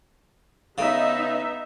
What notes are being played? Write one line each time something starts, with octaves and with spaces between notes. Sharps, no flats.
C#3 B3 D#4 E5